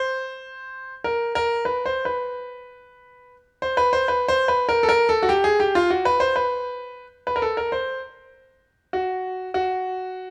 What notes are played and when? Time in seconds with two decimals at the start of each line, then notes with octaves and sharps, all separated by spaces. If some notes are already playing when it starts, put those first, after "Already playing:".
Already playing: C5
1.04 A#4
1.35 A#4
1.65 B4
1.86 C5
2.05 B4
3.62 C5
3.77 B4
3.93 C5
4.08 B4
4.28 C5
4.48 B4
4.69 A#4
4.83 A4
4.89 A#4
5.09 A4
5.23 F#4
5.29 G4
5.44 G#4
5.60 G4
5.75 F4
5.90 F#4
6.05 B4
6.20 C5
6.36 B4
7.27 B4
7.36 A#4
7.42 A4
7.57 A#4
7.72 C5
8.93 F#4
9.54 F#4